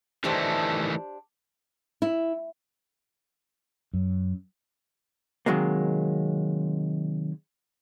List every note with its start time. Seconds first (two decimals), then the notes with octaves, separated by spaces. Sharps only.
0.24 D#3 E3 A3 D4 G4 C5
2.02 E4
3.93 F#2
5.46 C3 D#3 F#3 G#3 A#3